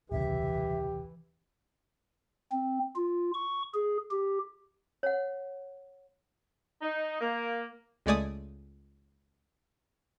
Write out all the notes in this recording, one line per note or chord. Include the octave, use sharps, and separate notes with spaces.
D#1 C2 C#3 E3 G4 E5
C4
F4
C#6
G#4
G4
C#5 F#5
D#4
A#3
C#2 G#3 A3 D5 G#5 D#6